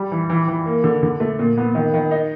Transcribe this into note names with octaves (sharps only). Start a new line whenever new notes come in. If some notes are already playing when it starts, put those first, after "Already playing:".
Already playing: G3
E3
E3
E3
A#3
D3
D3
A3
A#2
B3
D#3
D#3
D#4